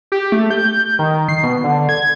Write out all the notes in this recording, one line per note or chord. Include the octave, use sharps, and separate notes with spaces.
G4
A3
G6
D#3
C7
B2
D3
G#6